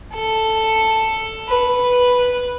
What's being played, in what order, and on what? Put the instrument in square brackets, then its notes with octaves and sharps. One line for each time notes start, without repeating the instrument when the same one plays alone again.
[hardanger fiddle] A4
B4